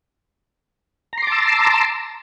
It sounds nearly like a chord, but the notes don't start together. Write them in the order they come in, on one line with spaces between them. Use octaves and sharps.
A#5 C6 D6 A5 E6